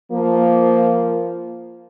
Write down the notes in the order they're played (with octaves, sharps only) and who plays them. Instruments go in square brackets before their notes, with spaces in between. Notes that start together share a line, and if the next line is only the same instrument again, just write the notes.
[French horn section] F3 A#3